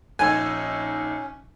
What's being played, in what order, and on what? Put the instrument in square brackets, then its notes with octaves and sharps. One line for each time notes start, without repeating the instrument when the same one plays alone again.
[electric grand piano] A#1 D#4 E6 [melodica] C#4 [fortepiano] G#5